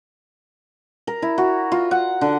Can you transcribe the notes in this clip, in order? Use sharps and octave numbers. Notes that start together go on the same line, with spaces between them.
A#4
E4
F#4
F4
F#5
D3